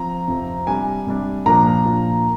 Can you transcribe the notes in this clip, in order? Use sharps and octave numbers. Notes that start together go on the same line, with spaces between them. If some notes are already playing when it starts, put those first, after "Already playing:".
Already playing: F3 C4 A#5
F2 C3 F3 C4
C3 G3 D4 G#5
C3 G3 D4
A#2 F3 A#3 D4 A#5
A#2 F3 A#3 D4